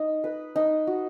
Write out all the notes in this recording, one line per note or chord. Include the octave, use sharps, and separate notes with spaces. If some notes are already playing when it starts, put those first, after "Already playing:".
Already playing: D#4
B4
D#4
F#4